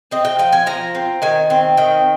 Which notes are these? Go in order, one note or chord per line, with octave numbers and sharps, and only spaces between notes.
C4 D#5
G5
F3 G5
G#5
F3 A#5
C4
D#3 G#5
C4
D#3 G5